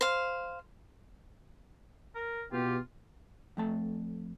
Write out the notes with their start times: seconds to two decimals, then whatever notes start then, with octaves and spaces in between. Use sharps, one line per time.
0.01 C5 F5
2.15 A#4
2.52 B2 B3 F4 G4
3.57 F2 A3 A5